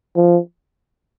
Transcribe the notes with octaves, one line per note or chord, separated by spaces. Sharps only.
F3